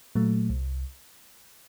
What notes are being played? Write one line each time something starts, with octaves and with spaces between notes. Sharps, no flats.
A#2 F#3 A3
C2